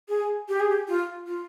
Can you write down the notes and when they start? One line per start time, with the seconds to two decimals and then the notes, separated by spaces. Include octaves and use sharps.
0.09 G#4
0.48 G4
0.60 G#4
0.70 G4
0.88 F4
1.27 F4